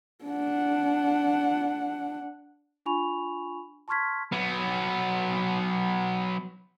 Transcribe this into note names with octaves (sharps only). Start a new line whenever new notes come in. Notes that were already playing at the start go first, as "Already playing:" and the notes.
D4 F#5
D4 F4 G#5 B5 C#6 F7
A5 C6 C#6 F6 G#6 B6
F#3 B3